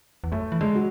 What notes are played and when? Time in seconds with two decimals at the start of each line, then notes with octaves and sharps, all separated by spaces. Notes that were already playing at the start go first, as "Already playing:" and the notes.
0.24 E2
0.32 F#2 A3
0.52 E3
0.61 D3 G#3
0.75 F#3